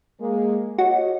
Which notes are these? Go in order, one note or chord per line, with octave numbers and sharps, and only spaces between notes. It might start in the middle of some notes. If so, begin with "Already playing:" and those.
G#3 A#3
F#4 G4 C#5 D#5